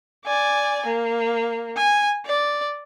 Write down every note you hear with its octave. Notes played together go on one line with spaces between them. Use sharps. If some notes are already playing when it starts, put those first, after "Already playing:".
D5 G#5
A#3
G#5
D5